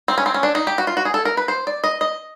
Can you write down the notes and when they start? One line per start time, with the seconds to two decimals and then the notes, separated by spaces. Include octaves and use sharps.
0.08 C4
0.18 C#4
0.26 C4
0.34 C#4
0.43 D4
0.55 D#4
0.67 G4
0.78 F#4
0.87 F4
0.97 F#4
1.05 G#4
1.14 A4
1.25 A#4
1.37 B4
1.48 C5
1.67 D5
1.84 D#5
2.01 D#5